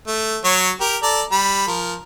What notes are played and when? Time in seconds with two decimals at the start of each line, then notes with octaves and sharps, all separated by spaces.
0.07 A3
0.45 F#3 C#5
0.80 G4 A#4
1.03 A4 D5 A#5
1.32 G3 B5
1.67 F3 A#4